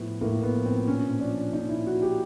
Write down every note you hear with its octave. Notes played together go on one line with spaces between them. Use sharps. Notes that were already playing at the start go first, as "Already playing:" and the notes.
Already playing: A2 F3 B3
A2 A#3
B3
F3
C4
A#2 C#4
F3 D4
A#2 D#4
E4
F3 F#4
G4